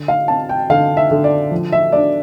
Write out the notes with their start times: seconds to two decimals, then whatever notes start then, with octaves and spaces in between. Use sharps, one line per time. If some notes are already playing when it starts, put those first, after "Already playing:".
Already playing: D3
0.08 F5
0.28 C4 A5
0.49 G5
0.70 D3 F5
0.97 E5
1.11 D3
1.24 D5
1.51 F3
1.72 E5
1.92 D4 D5